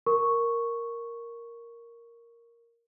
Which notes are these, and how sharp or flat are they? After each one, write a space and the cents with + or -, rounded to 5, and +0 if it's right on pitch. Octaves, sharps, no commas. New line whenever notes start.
A#4 +0 C#6 +0